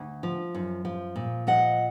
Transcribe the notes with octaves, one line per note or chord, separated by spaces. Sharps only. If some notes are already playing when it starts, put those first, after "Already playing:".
Already playing: D2
F3
F#2
F3
A#2
F3 D#5 F#5